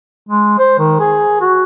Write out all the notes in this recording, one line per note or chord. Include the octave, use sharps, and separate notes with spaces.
G#3
C5
D#3
G#4
F#4